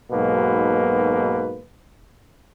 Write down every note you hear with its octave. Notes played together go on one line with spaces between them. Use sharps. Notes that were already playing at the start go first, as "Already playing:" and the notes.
B1 G#2 B2 A#3 B4